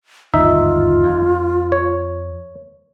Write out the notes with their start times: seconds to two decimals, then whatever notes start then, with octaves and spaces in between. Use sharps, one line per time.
0.34 G1 D#2 G#2 D#4 F4 E5
1.03 F2
1.72 C#5